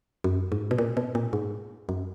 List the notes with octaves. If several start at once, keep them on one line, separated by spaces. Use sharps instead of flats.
F#2
G#2
B2
A#2
B2
A#2
G#2
F#2